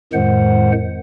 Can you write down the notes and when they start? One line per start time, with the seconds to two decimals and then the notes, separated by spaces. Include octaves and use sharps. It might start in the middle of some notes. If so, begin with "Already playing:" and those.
0.13 F2 A2 D#3 G#3 C5 F#5